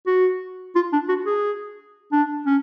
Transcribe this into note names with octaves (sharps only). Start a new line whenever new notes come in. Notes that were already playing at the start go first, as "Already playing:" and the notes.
F#4
F4
D4
F#4
G#4
D4
C#4